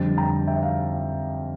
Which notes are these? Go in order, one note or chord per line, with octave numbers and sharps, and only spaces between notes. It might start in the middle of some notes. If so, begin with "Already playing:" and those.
Already playing: F2 D3 G3 A6
G5 A#5
E5 G5
F5